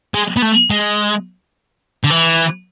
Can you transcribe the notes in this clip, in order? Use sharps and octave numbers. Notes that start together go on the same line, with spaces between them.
G#3
B3
A3
G#3
D3
E3